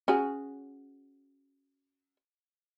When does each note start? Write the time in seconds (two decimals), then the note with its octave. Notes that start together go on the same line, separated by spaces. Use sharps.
0.08 C#4 F#4 G#4